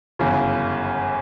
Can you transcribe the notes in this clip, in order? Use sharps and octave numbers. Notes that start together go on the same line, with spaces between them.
G1 F#2 C#3 E3